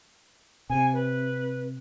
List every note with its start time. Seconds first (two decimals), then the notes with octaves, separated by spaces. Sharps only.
0.70 C3 G#5
0.93 B4